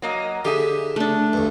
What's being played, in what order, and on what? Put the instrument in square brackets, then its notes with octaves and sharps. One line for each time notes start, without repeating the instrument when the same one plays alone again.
[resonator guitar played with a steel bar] F#3 A#3 D#5
[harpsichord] D3 [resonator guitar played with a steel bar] G4 G#4 E5
[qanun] A3 D4
[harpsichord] D2 G2